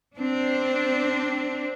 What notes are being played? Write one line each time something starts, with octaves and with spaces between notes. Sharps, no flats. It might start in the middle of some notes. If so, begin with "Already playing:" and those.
C4 D4